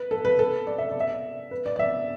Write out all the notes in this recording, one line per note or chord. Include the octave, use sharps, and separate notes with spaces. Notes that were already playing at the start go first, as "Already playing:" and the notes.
Already playing: B4
A4
B4
A4
D5
E5
D5
E5
D5
B4
D5
D5
E5